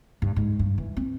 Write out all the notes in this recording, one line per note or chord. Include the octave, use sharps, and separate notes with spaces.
G2
G#2
G2
E3
C4